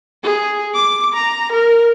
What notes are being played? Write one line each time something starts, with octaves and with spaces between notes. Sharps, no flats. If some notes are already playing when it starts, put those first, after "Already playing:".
G#4
D6
A#5
A#4